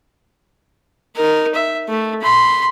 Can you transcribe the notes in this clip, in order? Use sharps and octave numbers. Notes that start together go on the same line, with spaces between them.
D#4 A#4
E5
A3
B5 C6